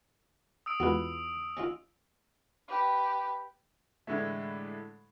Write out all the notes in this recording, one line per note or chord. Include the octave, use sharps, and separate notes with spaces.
D#6 E6 D7
E2 G#3 F4 F#4 B4
C#4 D#4 F4
G4 B4
A2 D3 E3 G#3 A3